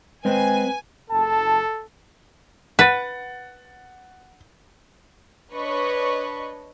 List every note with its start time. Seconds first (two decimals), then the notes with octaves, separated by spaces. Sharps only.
0.25 G#3 C4 B4 C5 G#5
1.10 F#1 A4 A5
2.79 B4 F#5 A6
5.52 D4 B4 C#5 D#5 C#6